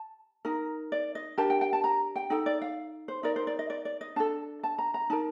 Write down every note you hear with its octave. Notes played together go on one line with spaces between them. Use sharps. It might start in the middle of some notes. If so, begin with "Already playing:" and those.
Already playing: A5
D#4 A#4
D5
D#5
D4 G4 A#4 A5
G5
G5
A5
A#5
G5
D#4 A4 G5
D5
F5
C5
D#4 A#4 D5
C5
D5
D#5
D5
D5
D#5
D4 A4 A5
A5
A#5
A#5
D#4 A#4 A5